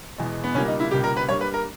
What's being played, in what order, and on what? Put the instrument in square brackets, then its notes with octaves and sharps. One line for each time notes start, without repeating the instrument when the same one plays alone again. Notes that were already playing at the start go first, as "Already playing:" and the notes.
[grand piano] E2 B2 G#3
B3
C#2 B2 G3 A#3 C#4
D#4
E4
C#2 B2 G3 A#3 G4
A#4
B4
G2 G3 A#3 C#5
B4
A#4